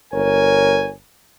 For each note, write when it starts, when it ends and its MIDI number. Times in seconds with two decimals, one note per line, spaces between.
0.12 0.92 31
0.12 0.92 70
0.12 0.92 73
0.12 0.92 80